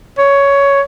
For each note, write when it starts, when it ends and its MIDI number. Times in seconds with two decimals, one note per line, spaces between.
0.18 0.82 73